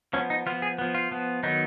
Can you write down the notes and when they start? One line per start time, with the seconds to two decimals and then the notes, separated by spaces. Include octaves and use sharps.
0.13 F3 B3 C#4
0.30 D#4
0.46 F3 B3 F4
0.62 G#4
0.78 F3 B3
0.94 F4
1.11 F3 B3
1.43 D#3 F#3 B3 D#4